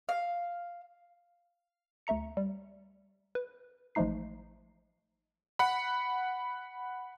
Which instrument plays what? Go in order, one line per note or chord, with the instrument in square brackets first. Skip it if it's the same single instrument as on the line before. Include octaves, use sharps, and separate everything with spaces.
[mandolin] F5
[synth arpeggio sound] D2 A3 E5 A#5 C#7
G3
B4
A1 F3 G#3 A3 D#4 C7
[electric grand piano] F#5 B5